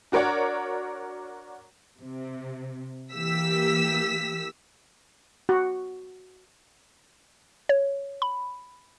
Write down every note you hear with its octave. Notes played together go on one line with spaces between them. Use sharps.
D4 F#4 A#4 C#5 D5 F#5
C3
E3 A#3 G4 E6 B6
F#4
C#5
B5